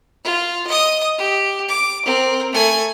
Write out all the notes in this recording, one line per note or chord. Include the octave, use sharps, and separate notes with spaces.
F4
D#5 D#6
G4
D6
C4 A#4
A3 G#5